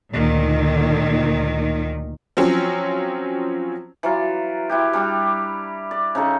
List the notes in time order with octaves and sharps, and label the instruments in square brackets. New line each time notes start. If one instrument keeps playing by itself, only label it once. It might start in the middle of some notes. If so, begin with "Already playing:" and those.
[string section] D2 A#2 D#3
[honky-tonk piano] F3 F#3 C4 C#4
[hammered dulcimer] E3 F#3 F4
E4 F#4 G4
G3 D4 G4 D6
D5
C#3 D#4 A4 C#6